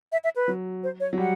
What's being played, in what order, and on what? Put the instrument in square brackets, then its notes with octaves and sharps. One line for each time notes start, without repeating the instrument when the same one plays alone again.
[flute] E5
E5
B4
[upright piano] F#3
[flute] C5
C#5
[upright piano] F#3
[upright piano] G3 [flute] F#5